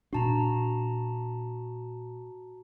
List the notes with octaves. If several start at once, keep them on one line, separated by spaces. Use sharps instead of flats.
A#2 D4 F#4 A5 A#5